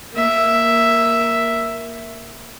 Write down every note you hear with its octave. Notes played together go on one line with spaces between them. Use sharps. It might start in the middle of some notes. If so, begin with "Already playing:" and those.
A#3 E5